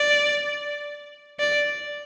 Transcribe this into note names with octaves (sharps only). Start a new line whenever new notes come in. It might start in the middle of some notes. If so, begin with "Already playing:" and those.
Already playing: D5
D5